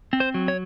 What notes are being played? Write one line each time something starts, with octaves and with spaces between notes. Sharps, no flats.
C4
C5
F#3
C#5